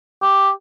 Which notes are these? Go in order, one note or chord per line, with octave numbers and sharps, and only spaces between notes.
G4